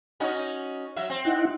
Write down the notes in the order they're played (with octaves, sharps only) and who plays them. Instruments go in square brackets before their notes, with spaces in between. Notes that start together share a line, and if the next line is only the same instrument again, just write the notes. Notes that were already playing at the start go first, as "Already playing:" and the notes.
[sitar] C#4 D#4 F#4
F#3 E5
C4
[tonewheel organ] D#4 E4 F#5